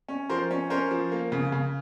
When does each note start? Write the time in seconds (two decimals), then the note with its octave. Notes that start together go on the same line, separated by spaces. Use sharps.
0.09 C#4
0.29 F3 A#4 C5
0.51 C#4
0.70 C#4 A#4 C5
0.91 F3
1.12 A#3
1.32 C#3
1.52 C#3